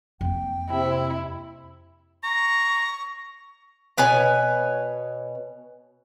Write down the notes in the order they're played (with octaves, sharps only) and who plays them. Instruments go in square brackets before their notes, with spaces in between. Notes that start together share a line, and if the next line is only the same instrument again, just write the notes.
[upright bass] F2 A#3 [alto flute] G5
[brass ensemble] C3 [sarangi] E4
[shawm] A#5 [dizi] C#6
[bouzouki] B2 B4 C#5 G#5